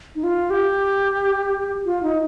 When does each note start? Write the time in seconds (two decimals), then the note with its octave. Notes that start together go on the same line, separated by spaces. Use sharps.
0.15 D#4
0.24 F4
0.50 G4
1.86 F4
2.03 D#4